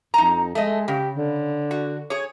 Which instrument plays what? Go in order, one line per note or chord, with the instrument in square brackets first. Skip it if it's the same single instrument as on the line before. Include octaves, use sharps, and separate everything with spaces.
[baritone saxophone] F2 [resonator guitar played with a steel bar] D#4 A#5
[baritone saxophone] G#3 [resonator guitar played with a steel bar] A3 D#5
[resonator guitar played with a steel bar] C#3 [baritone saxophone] G4
[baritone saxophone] D3
[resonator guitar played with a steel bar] F#4
G#4 C#5